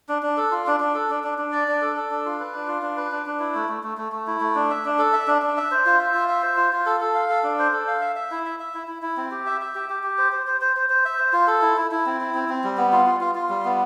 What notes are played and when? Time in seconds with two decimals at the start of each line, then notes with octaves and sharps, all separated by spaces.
0.09 D4
0.22 D4
0.37 A4
0.51 F4
0.67 D4
0.80 D4
0.94 A4
1.10 D4
1.23 D4
1.38 D4
1.52 D5
1.68 D4
1.82 A4
1.96 A4
2.11 D4
2.25 F4
2.40 B4
2.54 D4
2.68 F4
2.82 D4
2.96 B4
3.12 D4
3.26 D4
3.40 E4
3.55 A3
3.69 A3
3.83 A3
3.97 A3
4.12 A3
4.27 E4
4.41 A3
4.55 D4
4.70 E5
4.85 D4
4.99 A4
5.13 E5
5.27 D4
5.42 D4
5.57 E5
5.71 C5
5.86 F4
5.99 E5
6.14 F4
6.28 E5
6.43 C5
6.57 F4
6.73 F4
6.86 A4
7.00 A4
7.15 F5
7.29 A4
7.43 D4
7.59 C5
7.73 A4
7.87 F5
8.01 E5
8.16 E5
8.31 E4
8.46 E5
8.60 E5
8.74 E4
8.88 E4
9.02 E4
9.17 C4
9.31 G4
9.46 E5
9.61 E5
9.75 G4
9.89 G4
10.03 G4
10.18 C5
10.32 C5
10.47 C5
10.61 C5
10.76 C5
10.90 C5
11.05 E5
11.19 C5
11.33 F4
11.47 A4
11.62 E4
11.77 E4
11.91 E4
12.06 C4
12.21 E4
12.34 C4
12.49 C4
12.64 G3
12.77 B3
12.92 F4
13.06 F4
13.21 F4
13.35 F4
13.49 G3
13.65 B3